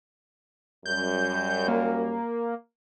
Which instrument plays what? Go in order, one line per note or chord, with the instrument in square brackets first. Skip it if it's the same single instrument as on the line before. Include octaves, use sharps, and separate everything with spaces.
[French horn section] F#2 G3 [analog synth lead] G6
[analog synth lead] A#3